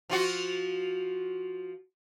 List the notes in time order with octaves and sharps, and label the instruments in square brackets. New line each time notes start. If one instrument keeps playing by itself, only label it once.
[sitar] F3 F4 F#4